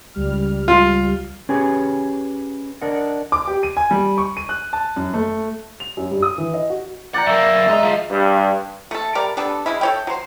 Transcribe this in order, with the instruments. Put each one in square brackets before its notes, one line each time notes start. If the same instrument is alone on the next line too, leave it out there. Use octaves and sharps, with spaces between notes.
[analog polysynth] C#2 G3 F6
[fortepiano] F4
[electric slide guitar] C#4 G4 G#4 B4 C#5 G#5
D4 A#4 D#5 F#5
[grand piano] D6
G4
D#7
G#5
G3
C#6
D#7
F#6
A5
F#2
A3
[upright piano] F7
F#2
G2
D#6
E3
D#5
F#4
[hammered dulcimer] D5 G5 A#5 [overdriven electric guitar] F#5
[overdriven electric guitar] F#2 A#3 [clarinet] E5
[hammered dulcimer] G#3 D#4 [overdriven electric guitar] D#5 A#5
[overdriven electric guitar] F3
[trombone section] G2
[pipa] A3 A4
G3 A#4 D5
G3 B3 D4 A4
C#3 G#3 E4
A4 C#5 G5
F#3 C5